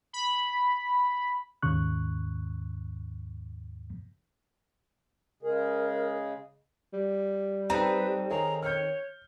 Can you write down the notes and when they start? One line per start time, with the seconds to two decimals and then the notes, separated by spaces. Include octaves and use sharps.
0.13 B5
1.63 D#2 G#2 C#3 C#6 F#6
5.43 C#3 G#3 G#4 A#4
6.93 G3
7.70 C4 D#4 A4 B4 A#5
8.31 D#3 G#4 C#5 A#5
8.63 C#5 F6 G6